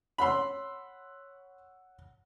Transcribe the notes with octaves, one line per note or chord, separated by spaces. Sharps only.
C#5 F#5 B5 C6 E6